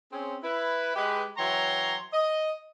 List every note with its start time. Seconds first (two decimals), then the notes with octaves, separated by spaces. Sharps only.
0.12 C4 C#4 G#4
0.43 E4 B4
0.95 G#3 G4 B4
1.38 E3 F#3 C#5 G5 A#5 C6
2.13 D#5